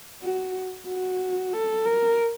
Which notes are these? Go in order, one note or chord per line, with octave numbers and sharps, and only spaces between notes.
F#4
F#4
A4
A#4